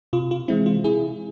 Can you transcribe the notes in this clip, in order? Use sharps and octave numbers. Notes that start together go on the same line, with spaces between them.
C3 F4
F4
E3 G#3 C4 E4
F4
C3 E4 G#4